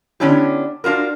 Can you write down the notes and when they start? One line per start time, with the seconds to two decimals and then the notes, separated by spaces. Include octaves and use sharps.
0.20 D3 B3 C#4 D4 E4 G4
0.84 D4 F4 F#4 A#4